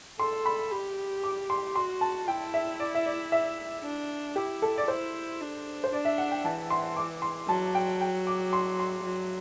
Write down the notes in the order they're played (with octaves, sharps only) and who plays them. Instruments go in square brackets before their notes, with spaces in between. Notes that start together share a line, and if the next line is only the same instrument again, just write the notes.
[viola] A4 [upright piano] C6
[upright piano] B5
[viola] G4
[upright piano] D6
C6
[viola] F#4 [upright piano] C6
[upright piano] A5
[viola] E4 [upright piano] G5
[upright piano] E5
D5
E5
D5
E5
[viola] D4
[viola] E4 [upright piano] G4
[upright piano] A4
D5
[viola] E4 [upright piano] C5
[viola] D4
[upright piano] C5
[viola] D4 [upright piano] D5
[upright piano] E5
F#5
G5
[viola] E3 [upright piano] A5
[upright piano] C6
D6
C6
[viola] F#3 [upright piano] A5
[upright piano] G5
G5
D6
C6
C6
[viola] F#3